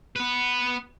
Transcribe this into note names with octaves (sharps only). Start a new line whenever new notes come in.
B3 B4